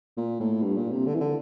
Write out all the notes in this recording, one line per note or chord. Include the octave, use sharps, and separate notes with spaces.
A#2
A2
G2
A#2
C3
D3
E3
D3